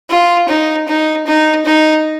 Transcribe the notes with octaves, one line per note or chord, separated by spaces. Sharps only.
F4
D#4
D#4
D#4
D#4